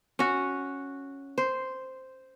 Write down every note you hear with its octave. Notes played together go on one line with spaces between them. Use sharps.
C#4 F#4
C5